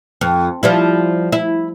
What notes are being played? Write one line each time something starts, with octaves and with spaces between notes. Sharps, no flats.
F2
F3 G3 E4
E4